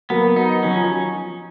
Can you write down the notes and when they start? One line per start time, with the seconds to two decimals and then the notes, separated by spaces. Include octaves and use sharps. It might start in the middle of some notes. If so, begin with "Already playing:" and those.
0.10 F#3 A#3 B3
0.36 D#4
0.63 D#3 F#3 C#4
0.76 F3